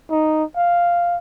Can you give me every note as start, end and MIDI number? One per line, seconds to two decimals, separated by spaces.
0.11 0.44 63
0.57 1.17 77